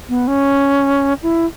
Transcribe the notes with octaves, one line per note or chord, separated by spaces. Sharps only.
B3
C#4
E4